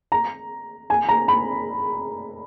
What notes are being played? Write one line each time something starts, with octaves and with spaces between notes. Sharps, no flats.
A#5
G#5
A#5
B5